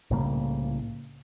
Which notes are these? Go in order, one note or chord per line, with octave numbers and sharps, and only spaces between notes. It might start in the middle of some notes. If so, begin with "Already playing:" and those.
C2 A2 C#3 A#3